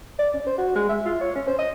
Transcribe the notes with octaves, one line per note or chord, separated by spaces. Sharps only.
D5
C#4
C5
F#4
G#3
E5
F4
C#5
C#4
C5
D#5